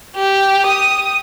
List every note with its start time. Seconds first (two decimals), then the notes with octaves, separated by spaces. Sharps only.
0.16 G4
0.66 D#6